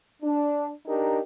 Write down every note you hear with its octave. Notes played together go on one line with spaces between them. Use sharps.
D4
D4 D#4 G4 A#4